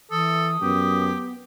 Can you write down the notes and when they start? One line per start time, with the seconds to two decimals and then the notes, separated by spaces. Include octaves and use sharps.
0.11 E3 A4 D#6
0.62 F#2 B3 G4